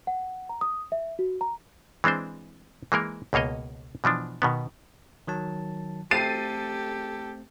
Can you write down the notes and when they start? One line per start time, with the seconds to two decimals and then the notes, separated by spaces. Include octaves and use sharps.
0.07 F#5
0.49 A#5
0.61 D#6
0.92 E5
1.19 F#4
1.41 A#5
2.04 E3 G#3 C4 D4 C5
2.92 E3 G#3 A#3 A#4
3.33 C#2 B2 A#3 C#5 D#5
4.04 B2 E3 F3 D4
4.42 B2 D#3 B3
5.27 D#3 F#3 A5
6.11 A3 C4 G4 A4 A6 C7 D#7